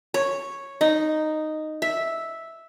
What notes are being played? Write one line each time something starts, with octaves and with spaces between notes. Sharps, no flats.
C#5
D#4
E5